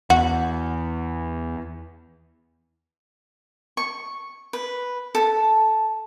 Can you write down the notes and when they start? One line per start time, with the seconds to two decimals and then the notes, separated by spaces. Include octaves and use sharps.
0.10 E2 F#4
3.77 C#6
4.53 B4
5.15 A4